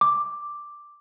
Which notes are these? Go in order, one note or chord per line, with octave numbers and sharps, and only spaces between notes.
D6